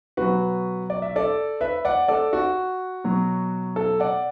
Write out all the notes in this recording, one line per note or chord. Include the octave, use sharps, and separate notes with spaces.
B2 F#3 F#4 B4
D5
E5
A4 D5
B4 E5
D5 F#5
A4 D5
F#4
B2 F#3
A4
D5 F#5